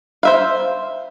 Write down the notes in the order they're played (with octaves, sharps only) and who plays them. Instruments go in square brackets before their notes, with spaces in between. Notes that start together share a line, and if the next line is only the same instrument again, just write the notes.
[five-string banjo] C5 E5 F5